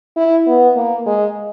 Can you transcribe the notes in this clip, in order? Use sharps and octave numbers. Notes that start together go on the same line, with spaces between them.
E4
B3
A#3
G#3